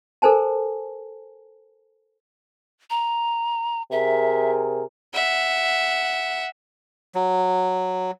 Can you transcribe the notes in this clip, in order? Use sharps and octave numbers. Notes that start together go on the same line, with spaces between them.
A4 A#4 C5 G#5 A5
A#5
C3 G#4 A#4 E5
E5 F#5
F#3